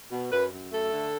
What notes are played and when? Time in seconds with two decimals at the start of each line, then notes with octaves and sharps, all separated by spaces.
0.12 B2
0.32 F#2 B4
0.52 F#2
0.72 A3 A4
0.92 D3